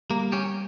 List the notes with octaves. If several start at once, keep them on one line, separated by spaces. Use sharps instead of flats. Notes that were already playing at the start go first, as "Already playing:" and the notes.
G3 A#3
C#4 G4